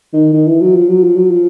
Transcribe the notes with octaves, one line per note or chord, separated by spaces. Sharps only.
D#3
D#3
E3
F#3
F3
F#3
F3
F#3
F3